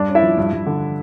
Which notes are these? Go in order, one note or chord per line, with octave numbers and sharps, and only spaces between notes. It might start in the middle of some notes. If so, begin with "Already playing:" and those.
Already playing: G2 D4 D5
C#4
E4 E5
F3
G2
G2
D3